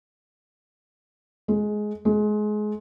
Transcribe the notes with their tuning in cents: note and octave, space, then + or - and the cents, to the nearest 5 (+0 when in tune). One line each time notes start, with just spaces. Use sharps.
G#3 +15
G#3 +25